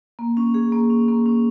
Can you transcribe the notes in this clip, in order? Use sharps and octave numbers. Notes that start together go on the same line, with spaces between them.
A#3
C#4
G#4
A#3
C#4
A#3
C#4